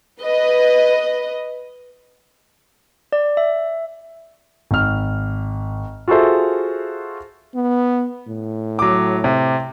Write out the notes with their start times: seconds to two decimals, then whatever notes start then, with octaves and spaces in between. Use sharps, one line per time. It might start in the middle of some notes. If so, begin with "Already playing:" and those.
0.20 B4 D#5
3.13 D5
3.37 E5
4.71 G#1 F6
6.08 F4 F#4 G#4 A4 C5 E5
7.55 B3
8.28 A2
8.79 F#3 D6
9.24 C3